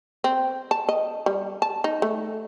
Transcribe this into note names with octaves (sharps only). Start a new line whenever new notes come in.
C4
A5
D#5
G3
A5
D#4
A3